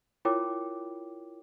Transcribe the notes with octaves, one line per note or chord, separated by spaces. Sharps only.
E4 F4 A#4 C#5 G5 D6